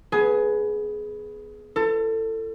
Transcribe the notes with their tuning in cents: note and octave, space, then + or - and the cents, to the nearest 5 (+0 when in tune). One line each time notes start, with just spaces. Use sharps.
B3 +0 G#4 +20
F4 -45 A4 +25